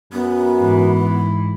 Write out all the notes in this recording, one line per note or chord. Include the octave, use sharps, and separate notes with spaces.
F#2 B3
G#2 E3 E4